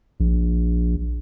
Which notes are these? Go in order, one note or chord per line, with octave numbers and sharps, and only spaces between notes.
A#1